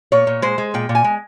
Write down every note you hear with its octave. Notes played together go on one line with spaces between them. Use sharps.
A#2 C#5
A#2
G#3 C5
G#3
A#2 G5
A#2
G#5
G#3